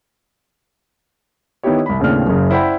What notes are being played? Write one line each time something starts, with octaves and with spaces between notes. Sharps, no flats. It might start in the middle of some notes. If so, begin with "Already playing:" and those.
D#3 B3 D#4 E4 G4 C#5
C2 B5
D#2 A2 C#3 C4 D4 F6
F#1 F#2 C#3
E4 C5 D5 F#5 G5 B5